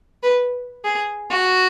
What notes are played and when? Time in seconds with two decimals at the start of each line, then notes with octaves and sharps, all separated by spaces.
0.23 B4
0.84 G#4
1.30 F#4